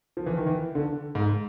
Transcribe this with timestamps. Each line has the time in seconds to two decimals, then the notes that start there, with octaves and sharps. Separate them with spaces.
0.17 F3
0.26 E3
0.37 D#3
0.47 E3
0.75 D3
1.15 G#2